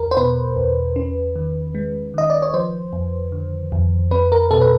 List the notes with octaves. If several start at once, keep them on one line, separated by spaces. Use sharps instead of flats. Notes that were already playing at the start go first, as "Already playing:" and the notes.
Already playing: E2 A#4
C5
B2 B4
E2
C#4
D#3
G#3
D#3 D#5
D5
C#5
F3 C5
F2
D3
F2
C4 B4
A#4
B2 A4
B4